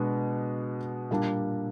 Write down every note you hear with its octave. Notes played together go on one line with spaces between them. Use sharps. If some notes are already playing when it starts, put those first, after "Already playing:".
Already playing: B2 G#3 B3 D4
A#2 G3 A#3 D4